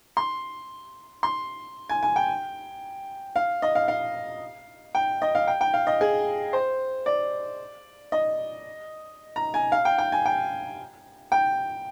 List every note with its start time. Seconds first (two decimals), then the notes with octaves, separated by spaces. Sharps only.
0.17 C6
1.23 C6
1.89 G#5
2.03 G#5
2.16 G5
3.36 F5
3.62 D#5
3.75 F5
3.88 F5
4.95 G5
5.22 D#5
5.35 F5
5.48 G5
5.61 G5
5.74 F5
5.87 D#5
6.01 G#4
6.53 C5
7.06 D5
8.12 D#5
9.36 A#5
9.54 G#5
9.72 F5
9.85 G5
9.98 G5
10.12 G#5
10.26 G5
11.32 G5